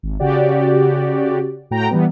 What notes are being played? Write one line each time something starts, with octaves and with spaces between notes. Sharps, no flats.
G#1
C#3 F#4 G4 D5
A2 F#4 G5 A#5
E3 G3 B3